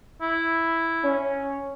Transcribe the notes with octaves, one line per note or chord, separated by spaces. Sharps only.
E4
C#4